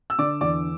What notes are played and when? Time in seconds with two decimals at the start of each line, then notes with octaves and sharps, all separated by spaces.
0.10 E6
0.18 D3 D5 D6
0.41 E2 D5 D6